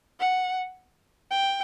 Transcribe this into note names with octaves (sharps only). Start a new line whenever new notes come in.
F#5
G5